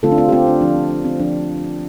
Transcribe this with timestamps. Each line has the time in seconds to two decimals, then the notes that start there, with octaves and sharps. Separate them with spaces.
0.03 D3 A3 C4 F4 A4
0.12 D4
0.18 C4 F4
0.29 G4
0.32 C4 F4
0.47 D4
0.61 F3 C4 D4
0.76 C4
0.90 D4
1.05 C4
1.20 F3 C4 D4